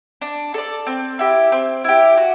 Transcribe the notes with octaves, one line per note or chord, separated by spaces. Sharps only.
D4
A4 D5
C4
E4 G4
C4
E4 G4
F#4